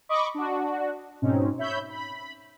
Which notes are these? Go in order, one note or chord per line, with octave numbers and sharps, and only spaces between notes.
D#5 B5 C#6 D6
D4 F#4
G#2 B2 C4 C#4 D#4
C#5 E5 B5 G6
B5